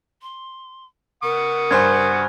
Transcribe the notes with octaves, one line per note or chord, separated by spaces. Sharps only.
C6
A#4 F#5 C#6 D#6
G2 C5 G#5 F#6 G#6